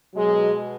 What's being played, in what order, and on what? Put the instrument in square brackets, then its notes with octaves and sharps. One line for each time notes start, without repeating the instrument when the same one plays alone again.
[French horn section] B2 F#3 G#3